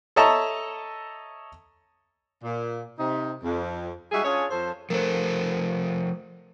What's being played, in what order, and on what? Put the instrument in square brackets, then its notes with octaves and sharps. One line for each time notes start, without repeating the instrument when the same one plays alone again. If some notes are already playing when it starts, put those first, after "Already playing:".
[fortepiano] A4 C#5 D#5 E5 A5 A#5
[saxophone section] A#2
C3 D#4
F2
G3 G#3 D#4 F#4 G#4 E5
C#4 D4 F4 G#4 C#5
F2 F3 A4 C5
[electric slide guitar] F3 A3 A4 [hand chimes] A#4 C5